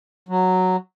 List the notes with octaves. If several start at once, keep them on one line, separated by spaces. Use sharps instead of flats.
F#3